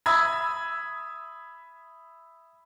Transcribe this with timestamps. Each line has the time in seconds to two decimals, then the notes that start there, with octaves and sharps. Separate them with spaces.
0.06 E5 B5 D#6 E6 G#6